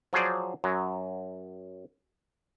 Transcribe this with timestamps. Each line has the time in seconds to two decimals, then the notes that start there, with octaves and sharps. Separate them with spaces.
0.13 F3 F#3 G#4 C5 D5
0.64 F#2 F#3